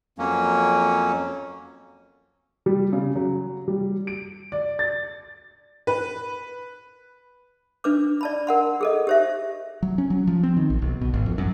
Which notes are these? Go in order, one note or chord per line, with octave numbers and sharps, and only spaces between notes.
F2 F#3 A#3 C#4
G3
C#3
F#3
G3
D7
D5
A6
B4
D4 B4 D6
D5 A5 B5
A#4 F#5 C6
G#4 A4 D#5
G4 C5 E5
F#3
C#4
F#3
F3
C4
D#3
A#1
B1
B2
G#1
F2
F#2